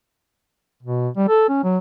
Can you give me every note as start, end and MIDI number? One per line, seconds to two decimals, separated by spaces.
0.83 1.09 47
1.17 1.27 55
1.28 1.45 69
1.49 1.61 61
1.63 1.78 54